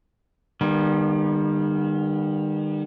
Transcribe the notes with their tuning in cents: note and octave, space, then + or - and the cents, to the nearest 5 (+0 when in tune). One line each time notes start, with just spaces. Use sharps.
D#3 -35 G3 +25 B3 -30